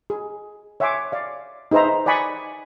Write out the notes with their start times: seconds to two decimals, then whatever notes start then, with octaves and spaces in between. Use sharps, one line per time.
0.10 G#4
0.80 C#5 E5 F#5 G#5 C6 D6
1.12 D5 F5
1.71 D#4 G#4 B4 C5 E5 A#5
2.06 D5 F#5 G#5 B5 C#6 D#6